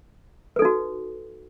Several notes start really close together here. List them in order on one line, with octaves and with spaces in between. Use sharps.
B4 A4 D#4 F#4